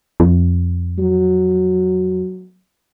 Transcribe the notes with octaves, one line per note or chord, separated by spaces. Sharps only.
F2
F#3